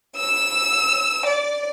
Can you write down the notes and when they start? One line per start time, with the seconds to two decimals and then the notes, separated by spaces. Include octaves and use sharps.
0.16 E6
1.25 D5